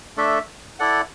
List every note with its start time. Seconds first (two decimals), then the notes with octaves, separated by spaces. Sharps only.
0.17 A3 D4 A4 E5
0.79 E4 A4 D5 F#5